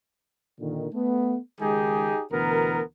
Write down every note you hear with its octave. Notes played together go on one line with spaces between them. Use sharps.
A#2 D3 D#3
A3 B3
C#2 D#3 G#3 D#4 G4 G#4
D2 B2 E3 B3 A#4